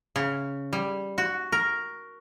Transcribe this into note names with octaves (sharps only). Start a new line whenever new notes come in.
C#3
G3
F#4
A#4